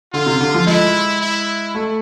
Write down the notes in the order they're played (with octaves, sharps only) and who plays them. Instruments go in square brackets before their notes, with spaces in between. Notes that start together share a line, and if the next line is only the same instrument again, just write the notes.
[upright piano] D3 [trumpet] F4
[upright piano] C3
D3
F3
[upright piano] G#3 [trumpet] E4
[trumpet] E4
[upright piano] A3